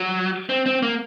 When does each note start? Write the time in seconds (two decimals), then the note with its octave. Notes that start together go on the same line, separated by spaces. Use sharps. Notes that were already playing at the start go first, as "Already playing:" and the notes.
Already playing: F#3
0.49 C4
0.66 C4
0.83 A#3